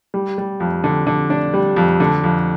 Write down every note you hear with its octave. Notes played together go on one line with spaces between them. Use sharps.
G3
G3
F2
D3
D3
D4
G3
F2
D3
F2